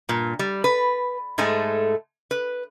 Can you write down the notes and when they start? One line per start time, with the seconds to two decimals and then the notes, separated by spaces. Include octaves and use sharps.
0.09 G2 A#2
0.39 G3
0.64 B4
1.38 G#2 G#3 A3 A4 G#5
2.31 B4